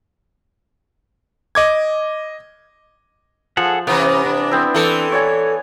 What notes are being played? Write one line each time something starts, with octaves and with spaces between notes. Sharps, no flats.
D#5 D6 G#6
F3 G#4 A4 F#5
C3 E3 B3 C#4
D4
B3 C4 E4
E3 A4
C#5 D5 G#5